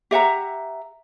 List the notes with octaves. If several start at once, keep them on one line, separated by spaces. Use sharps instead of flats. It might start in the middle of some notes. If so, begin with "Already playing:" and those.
G4 E5 F#5 A#5